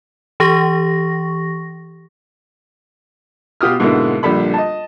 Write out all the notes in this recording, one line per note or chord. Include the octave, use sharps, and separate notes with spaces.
E3 G4 C#6 A#6
B2 F4 G4 D#6 F6
G#2 B2 D3 G#3 A#3 E4
A#1 D3 G3 A4 B5
D#5 A5